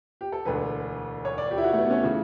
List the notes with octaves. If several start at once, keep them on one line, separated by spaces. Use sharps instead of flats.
G4
A4
E1 D2 D3 B4
C#5
D5
G4
E4
F#4
A3
B3
C#4
C#3 E3 A3